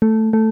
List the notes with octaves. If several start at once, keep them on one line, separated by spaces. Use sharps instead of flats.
A3
A3